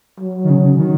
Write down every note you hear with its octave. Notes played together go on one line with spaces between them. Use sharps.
F#3
D#3
C#3
C#3
D#3